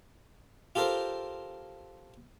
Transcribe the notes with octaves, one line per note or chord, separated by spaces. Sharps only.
F4 G4 A4 A#4 C5